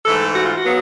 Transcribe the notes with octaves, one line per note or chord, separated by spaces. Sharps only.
G#2 E3 A3 A4
F#4
F4
F#4
C#3 F#3 B3